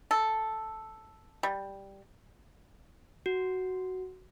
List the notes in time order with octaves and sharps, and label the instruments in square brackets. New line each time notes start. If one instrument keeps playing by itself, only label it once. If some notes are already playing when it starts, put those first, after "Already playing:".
[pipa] A4
G3
[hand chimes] F#4